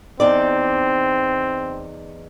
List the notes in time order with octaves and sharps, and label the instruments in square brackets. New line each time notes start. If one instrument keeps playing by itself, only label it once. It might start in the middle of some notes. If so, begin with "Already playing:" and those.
[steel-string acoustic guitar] E2 D#4 D5 [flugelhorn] C4